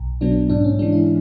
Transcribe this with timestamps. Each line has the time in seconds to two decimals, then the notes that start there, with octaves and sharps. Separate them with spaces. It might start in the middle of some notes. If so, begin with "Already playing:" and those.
Already playing: B1
0.21 B2 F#3 B3 D4
0.49 G#2 D4
0.64 C#4
0.79 E3 G#3 D4
0.92 E4